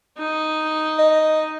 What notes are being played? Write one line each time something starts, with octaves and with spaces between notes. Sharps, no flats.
D#4
D#5